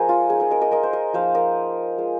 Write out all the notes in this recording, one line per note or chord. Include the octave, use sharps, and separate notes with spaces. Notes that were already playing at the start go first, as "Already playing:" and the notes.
Already playing: F3 A#3 G#4 A#4 C5 D#5
F4
G#3 D#4 G#4
A#4 D#5
A#4 D#5
A#4 D#5
A#4 D#5
C5
A#4 D#5
F3 A#3 D#4 C5 F5
A#4 D#5
G#3 F4